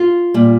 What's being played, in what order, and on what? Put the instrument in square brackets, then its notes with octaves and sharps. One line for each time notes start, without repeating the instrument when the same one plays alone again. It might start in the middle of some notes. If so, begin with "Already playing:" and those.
Already playing: [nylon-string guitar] F4
A#2 G3